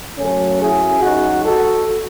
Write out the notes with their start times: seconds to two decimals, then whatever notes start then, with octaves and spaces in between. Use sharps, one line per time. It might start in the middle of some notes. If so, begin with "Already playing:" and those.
0.18 F#2 C#3 F#3 A3 C#4
0.61 E4 G#4
1.03 D#4 F#4
1.45 F#4 A4